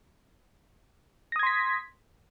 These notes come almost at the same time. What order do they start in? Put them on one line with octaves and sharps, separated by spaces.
A#6 D#6 G#6 C6 B6